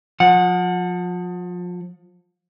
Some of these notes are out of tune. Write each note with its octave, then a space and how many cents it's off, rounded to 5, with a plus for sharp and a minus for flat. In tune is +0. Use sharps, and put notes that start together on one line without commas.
F3 +30 F#5 -15